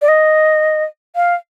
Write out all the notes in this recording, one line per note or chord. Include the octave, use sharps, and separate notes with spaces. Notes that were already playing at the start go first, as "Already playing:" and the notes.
D5
D#5
F5